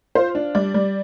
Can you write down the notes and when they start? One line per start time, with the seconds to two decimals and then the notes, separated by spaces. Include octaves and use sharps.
0.15 F4 C5
0.35 D4
0.55 G3 D5
0.74 G3